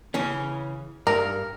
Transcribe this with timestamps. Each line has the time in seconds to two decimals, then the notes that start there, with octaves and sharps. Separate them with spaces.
0.14 C#3 E3 C#4
1.07 G2 A#4